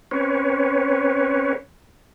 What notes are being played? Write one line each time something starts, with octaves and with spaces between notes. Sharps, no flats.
C4 C#4 B4 C#5